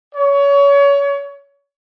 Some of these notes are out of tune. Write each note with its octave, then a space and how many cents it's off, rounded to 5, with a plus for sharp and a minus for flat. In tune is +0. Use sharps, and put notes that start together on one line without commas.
C#5 +25